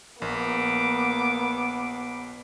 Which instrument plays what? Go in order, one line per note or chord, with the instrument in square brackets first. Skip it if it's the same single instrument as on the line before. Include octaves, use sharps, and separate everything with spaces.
[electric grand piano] A#1 [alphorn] A#3 [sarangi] B3 [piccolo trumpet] D6